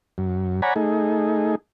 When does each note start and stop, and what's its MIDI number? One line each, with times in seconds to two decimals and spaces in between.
0.18 0.61 42
0.62 0.74 73
0.62 0.74 74
0.62 0.74 78
0.62 0.74 80
0.62 0.74 82
0.62 0.74 83
0.76 1.55 57
0.76 1.55 63
0.76 1.55 68